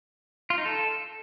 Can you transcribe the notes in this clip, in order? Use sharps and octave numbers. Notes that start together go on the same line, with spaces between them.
F4
D#4
A4